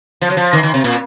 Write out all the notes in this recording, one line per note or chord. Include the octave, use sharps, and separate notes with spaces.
F3
F#3
F3
D#3
D#3
C3
A#2